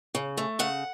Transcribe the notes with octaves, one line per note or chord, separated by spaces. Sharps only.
C#3
A3
C#3 F#5